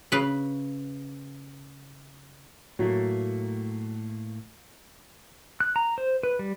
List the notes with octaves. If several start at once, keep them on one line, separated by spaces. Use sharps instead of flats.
C#3 B4
A2 F#3 A3 A#3
F#6
A#5
C5
B4
G3